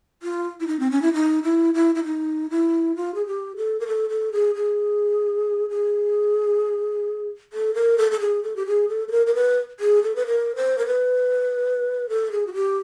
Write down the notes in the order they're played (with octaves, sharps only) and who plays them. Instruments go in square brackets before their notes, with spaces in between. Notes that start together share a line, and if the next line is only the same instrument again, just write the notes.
[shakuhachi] F4
E4
D#4
C4
C#4
E4
D#4
E4
E4
E4
D#4
E4
F4
G#4
G4
A4
A#4
A4
A4
G#4
G#4
G#4
A4
A#4
A4
A4
G#4
A4
G4
G#4
A4
A4
A#4
A#4
B4
G#4
A4
B4
A#4
C5
A#4
B4
A4
G#4
F#4
G4